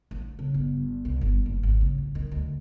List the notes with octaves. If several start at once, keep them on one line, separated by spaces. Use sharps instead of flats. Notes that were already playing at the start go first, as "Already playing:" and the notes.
A1
C#3
G1
C2
G1
F#1
G#1
C#3
A1
D#3
D2